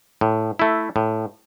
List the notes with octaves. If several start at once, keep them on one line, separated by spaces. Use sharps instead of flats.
A2
A3 E4
A2